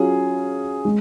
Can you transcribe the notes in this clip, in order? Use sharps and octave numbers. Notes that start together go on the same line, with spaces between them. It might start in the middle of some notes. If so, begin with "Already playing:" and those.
Already playing: F#3 C#4 F4 G#4
G#3